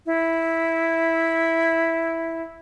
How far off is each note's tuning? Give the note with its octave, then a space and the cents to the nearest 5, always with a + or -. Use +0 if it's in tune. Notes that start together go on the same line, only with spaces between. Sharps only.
E4 -5